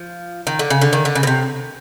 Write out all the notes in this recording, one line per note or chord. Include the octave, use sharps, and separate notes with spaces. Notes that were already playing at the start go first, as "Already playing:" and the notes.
Already playing: F3
D#3
D3
C#3
D3
D#3
D3
C#3
B2
C3